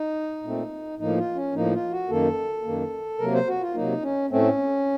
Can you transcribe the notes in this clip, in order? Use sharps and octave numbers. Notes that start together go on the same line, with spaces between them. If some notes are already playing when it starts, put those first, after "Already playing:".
Already playing: D#4
A#2 A3 C4
A2 F3 A#3 D#4
F4
C#4
A2 F3 A#3 D#4
F4
F#4
F#2 D#3 A#3 A4
F#2 D#3 A#3
C3 F#3 A#3 A#4
C5
F#4
F4
C3 F#3 A#3 D#4
C#4
A2 A3 C4 C#4